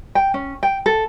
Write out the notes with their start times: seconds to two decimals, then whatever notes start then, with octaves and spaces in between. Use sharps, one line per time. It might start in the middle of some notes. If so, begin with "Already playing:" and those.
0.15 G5
0.34 C#4
0.63 G5
0.86 A4